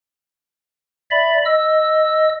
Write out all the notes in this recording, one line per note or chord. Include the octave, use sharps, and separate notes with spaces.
D5 E5 B5
D#5 E6